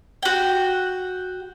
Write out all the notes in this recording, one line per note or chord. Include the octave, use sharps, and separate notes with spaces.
F#4 G5